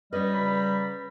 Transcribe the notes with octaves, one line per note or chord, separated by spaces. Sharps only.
G3 C#4 F#4 B4 C#5 D#5
C#3 A#5 B5